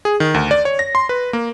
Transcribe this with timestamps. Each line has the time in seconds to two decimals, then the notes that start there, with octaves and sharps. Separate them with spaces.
0.05 G#4
0.20 D#3
0.34 D2
0.51 D5
0.65 C#5
0.79 A#6
0.95 C6
1.09 B4
1.33 A#3